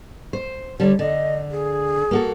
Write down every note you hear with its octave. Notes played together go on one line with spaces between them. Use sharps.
C5
D3 G3 A4 C#5
D3 D#5
G#4
A#3 F#4 A4